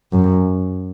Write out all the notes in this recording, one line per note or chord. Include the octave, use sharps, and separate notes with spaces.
F#2